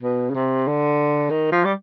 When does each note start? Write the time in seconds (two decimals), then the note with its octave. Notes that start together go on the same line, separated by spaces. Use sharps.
0.03 B2
0.30 C#3
0.35 C3
0.68 D3
1.30 D#3
1.52 F3
1.65 G3